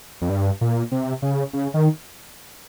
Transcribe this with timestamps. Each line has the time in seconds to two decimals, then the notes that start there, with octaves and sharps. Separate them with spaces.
0.22 F2
0.29 G2
0.61 A#2
0.92 C3
1.22 C#3
1.53 C#3
1.74 D#3